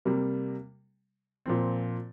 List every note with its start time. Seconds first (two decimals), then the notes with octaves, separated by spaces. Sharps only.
0.05 C3 G3 A#3
1.46 A#2 F3 C4